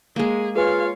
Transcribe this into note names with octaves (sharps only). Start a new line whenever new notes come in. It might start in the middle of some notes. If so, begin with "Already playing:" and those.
G#3 A#3 G#4
F4 G#4 B4 C#5 F5 G#5